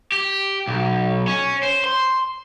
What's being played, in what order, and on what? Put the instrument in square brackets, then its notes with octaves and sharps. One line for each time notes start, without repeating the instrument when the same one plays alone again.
[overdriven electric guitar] G4
B1
C#4
C5
C6